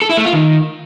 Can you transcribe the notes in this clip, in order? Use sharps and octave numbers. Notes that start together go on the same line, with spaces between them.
A4
E4
A3
F4
D#3